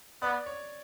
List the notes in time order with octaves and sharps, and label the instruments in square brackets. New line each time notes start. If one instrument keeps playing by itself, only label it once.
[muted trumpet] B3 [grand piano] D5
[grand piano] C#5